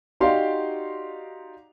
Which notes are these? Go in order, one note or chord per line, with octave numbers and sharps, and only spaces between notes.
D#4 F#4 G4 D5 F5 C6